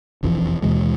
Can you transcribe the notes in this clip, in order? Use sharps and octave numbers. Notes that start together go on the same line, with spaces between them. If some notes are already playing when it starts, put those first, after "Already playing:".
E1 A#1 F2 E3
D#2 B2 E3 G#3